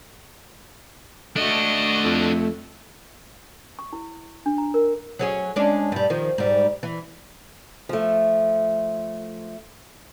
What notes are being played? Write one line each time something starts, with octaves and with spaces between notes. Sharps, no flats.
A3 D4 F#4 D#5
F2
C#6
E4
D4
A#5
A#4
F#3 C#4 G#4
G#3 C#4 D4
G2 G3
D#3 F3
G#2 G3
E3
F3 A3